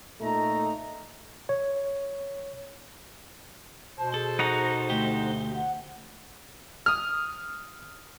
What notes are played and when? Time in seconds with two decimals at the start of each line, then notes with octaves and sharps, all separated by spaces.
0.21 A#2 A3 D#4 A#5
1.49 C#5
3.98 B2 C5 A5
4.14 G#4 A4
4.39 D#4 F#4 A#5
4.90 D2 A3 G4
5.54 F#5
6.86 D#6 F6